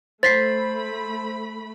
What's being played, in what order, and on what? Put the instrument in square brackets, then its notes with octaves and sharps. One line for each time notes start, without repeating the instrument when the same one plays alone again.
[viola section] A3 B5 [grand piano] C5 [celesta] A6 B6 C7